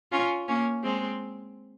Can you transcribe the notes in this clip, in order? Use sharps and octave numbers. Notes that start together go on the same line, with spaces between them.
C#4 F4
A#3 C#4
G#3 C4